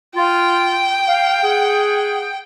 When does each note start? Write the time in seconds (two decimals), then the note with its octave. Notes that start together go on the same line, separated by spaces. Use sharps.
0.16 F4 G5
1.07 F5
1.43 G#4 F#5